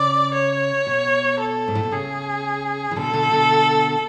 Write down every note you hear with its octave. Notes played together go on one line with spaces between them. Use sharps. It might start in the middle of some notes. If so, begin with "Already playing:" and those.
Already playing: C#3 D5
C#5
B2
A4
G#2
A2
B2
C#3 G#4
E3
B2 D3 A4
B2 D3
B2 D3